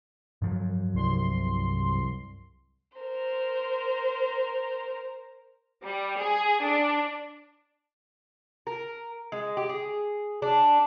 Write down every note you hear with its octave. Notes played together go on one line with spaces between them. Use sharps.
G2 F3 F#3
C2 C6
A#4 C5
G3
G#4
D4
A#4
G#3
G4
G#4
D4